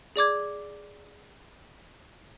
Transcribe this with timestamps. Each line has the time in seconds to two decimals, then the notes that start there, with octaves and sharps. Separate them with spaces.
0.16 G#4 D5 D6 G#6